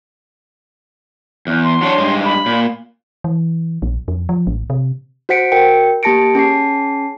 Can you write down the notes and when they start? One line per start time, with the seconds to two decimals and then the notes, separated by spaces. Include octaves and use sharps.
1.47 E2
1.64 C6
1.81 F#3 D4 C#5
1.98 G2 G#3
2.25 B5
2.46 A#2
3.24 E3
3.82 A#1
4.08 F2
4.29 F3
4.47 A1
4.70 C3
5.29 F#4 C5 F#5 B6 C#7 D7
5.52 F#4 A#4 G5 C#7
6.03 A#3 G4 A5 A#6 C#7 D7
6.35 C#4 G#4 A5 C7